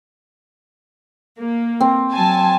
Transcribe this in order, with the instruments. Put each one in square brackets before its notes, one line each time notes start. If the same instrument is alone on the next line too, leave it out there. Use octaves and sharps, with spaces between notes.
[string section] A#3
[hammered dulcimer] C4
[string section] F#3 G#5 A5